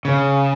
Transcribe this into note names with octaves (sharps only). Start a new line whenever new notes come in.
C#3